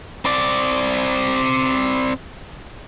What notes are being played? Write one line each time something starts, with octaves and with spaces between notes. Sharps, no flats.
C4 D5